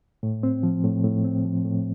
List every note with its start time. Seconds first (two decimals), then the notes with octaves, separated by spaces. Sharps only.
0.23 A2
0.43 C4
0.63 F3
0.84 A2
1.04 A2
1.24 C4
1.45 F3
1.65 A2